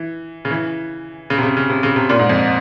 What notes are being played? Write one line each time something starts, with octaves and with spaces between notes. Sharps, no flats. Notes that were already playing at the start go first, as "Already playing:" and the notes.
Already playing: E3
C#3
E3
C#3
C3
C#3
C#3
C3
C#3
C3
A#2
G#2
F2